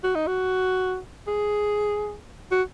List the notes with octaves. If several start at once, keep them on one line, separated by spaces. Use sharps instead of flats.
F#4
D#4
F#4
G#4
F#4